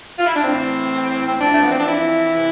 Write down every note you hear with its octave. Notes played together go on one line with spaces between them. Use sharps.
F4
E4
D4
A2 E3 C4
C4
F2 E3 D4
A3
B3
C4
D4
E4
C3 E3